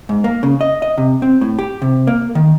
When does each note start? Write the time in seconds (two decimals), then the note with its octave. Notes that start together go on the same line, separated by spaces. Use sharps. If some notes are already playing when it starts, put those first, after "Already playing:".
0.09 G#2
0.24 A#3
0.43 C#3
0.61 D#5
0.82 D#5
0.98 C3
1.22 C4
1.41 A2
1.59 G4
1.82 C3
2.07 A#3
2.35 D#3